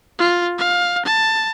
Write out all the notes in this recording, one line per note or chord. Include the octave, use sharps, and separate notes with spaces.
F4
F5
A5